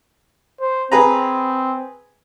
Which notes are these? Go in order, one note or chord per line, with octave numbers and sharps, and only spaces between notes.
C5
C4 G#4 B4 A#5